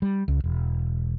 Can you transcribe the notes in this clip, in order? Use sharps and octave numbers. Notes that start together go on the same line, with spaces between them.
G3
C#2
E1